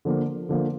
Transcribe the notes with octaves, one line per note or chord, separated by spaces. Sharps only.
D3 F3 A#3
D3 F3 A#3